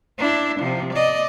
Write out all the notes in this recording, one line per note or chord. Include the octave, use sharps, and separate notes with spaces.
D4 E4
C3 F3
D5 D#5